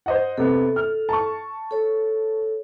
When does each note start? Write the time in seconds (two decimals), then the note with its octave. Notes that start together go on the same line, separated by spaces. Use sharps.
0.06 C5 D#5 F#5
0.38 C3 B3 A4
0.76 F6
1.09 A5 C#6
1.71 A4 C#5